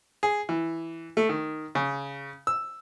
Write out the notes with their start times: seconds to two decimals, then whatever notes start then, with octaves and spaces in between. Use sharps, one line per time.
0.23 G#4
0.49 E3
1.17 A3
1.29 D#3
1.75 C#3
2.47 E6